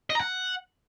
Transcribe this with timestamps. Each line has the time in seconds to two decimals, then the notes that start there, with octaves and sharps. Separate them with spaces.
0.10 D#5
0.15 A#5
0.20 F#5